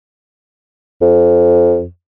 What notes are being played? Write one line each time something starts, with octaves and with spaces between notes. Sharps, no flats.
F2